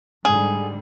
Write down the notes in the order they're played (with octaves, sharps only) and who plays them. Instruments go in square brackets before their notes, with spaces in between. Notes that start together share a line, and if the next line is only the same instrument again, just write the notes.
[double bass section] G#2 D3 G3 [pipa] G#4